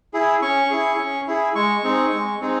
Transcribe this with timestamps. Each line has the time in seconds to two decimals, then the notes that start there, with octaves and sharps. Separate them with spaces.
0.13 E4 G#4
0.42 C#4 C#6
0.70 E4 G#4
0.98 C#4
1.27 E4 G#4
1.55 G#3 C#6
1.83 C4 D#4 G#4
2.12 G#3
2.40 C4 D#4 G#4